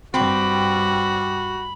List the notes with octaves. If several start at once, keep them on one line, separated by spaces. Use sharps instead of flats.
G2 G3 C4 F#4 B5